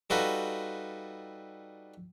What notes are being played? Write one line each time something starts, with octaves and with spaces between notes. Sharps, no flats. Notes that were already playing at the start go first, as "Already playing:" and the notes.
G3 D#4 F4 F#4 A4 B4